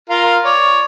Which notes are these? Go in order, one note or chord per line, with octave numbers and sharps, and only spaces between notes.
F4 A#4 F5
C#5 D5